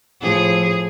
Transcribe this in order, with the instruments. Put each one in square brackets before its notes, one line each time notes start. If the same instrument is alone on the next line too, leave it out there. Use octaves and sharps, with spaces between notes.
[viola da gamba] A2 F3 G#4